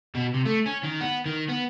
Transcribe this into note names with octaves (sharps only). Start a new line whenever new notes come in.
B2
C3
A3
C#4
D#3
B3
D#3
B3